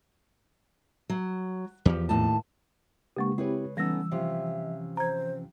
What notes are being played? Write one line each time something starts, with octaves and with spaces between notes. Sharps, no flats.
F#3
E2 F3 G4
D#2 A2 A5
C#3 G#3 A#3 D4 G4 C#6
C4 E4 G4 G#4 B4 C#5
E3 G3 A3 B3 C#4 D#4 E6 A#6
C3 F3 C#4 E5
C5 A#5 G#6